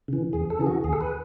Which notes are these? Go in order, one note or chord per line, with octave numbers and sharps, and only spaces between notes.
C#3 E3
E2 G#4
A4
C#3 E3 G#4
F#4
D#2 G#4
A4
B4